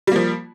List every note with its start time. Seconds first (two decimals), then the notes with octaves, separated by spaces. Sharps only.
0.07 G3
0.12 A#3
0.16 F3